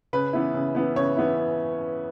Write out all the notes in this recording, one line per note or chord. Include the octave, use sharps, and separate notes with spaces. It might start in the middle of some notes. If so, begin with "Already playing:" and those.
C#3 B4
E3 B3 E4
C#3
E3 B3 E4
C#3 C#5
E3 B3 E4